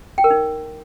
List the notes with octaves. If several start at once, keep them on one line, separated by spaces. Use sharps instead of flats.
G5
A#4
D#4